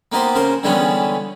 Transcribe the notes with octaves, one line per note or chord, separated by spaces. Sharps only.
A#3 B3 D#4 G4 C5
C#3 A#4 C5
D3 E3 G3 G#3 B3 C#4